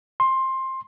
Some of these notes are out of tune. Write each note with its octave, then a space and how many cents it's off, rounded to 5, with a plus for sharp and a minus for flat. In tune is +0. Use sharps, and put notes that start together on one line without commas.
C6 +15